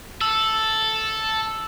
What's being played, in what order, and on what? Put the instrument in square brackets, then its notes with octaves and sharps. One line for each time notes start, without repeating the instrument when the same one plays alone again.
[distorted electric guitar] A4 [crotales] E6